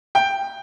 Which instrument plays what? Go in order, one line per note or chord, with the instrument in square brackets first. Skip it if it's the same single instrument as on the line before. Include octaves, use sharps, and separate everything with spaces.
[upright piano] G5